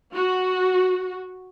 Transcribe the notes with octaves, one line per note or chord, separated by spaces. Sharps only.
F#4